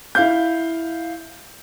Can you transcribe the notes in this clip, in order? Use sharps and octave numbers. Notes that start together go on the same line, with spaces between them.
E4 F5 G6